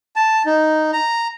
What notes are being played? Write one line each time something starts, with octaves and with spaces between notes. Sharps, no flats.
A5
D#4
A#5